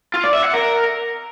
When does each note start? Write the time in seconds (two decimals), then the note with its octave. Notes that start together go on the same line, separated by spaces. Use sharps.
0.14 F4
0.24 D5
0.34 E5
0.44 F#5
0.53 A#4